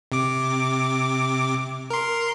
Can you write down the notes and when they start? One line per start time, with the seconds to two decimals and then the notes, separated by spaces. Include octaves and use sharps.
0.12 C3 D6
1.90 A#4 C6